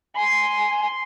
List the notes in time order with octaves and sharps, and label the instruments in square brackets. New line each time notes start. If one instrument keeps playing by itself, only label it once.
[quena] G#5 [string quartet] C6